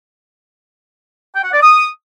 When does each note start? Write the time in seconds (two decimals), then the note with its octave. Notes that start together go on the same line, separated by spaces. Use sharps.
1.34 G5
1.44 F#5
1.53 D5
1.62 D#6